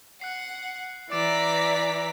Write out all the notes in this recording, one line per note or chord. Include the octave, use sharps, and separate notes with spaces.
F#5 F#6 C7
E3 D5 A#5 D6 A6 B6 D7